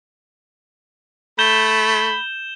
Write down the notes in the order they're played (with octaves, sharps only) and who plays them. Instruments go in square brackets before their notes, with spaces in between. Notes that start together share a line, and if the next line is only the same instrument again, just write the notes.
[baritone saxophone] A3 [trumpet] B5 [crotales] G6 E7 G7